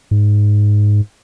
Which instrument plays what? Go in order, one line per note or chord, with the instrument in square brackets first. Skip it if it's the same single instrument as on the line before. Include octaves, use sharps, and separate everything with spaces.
[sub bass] G#2